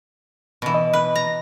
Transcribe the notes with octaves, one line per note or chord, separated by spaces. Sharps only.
B2 E3
D#5
B4
A#5